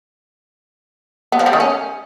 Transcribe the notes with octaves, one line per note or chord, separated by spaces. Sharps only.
B3
F3
G3
D#3
C#4